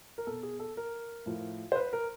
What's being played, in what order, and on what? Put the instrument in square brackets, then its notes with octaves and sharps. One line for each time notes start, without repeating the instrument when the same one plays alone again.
[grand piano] A#4
B2 A4
G#4
A4
A#4
A2 F3
C5
B4
A#4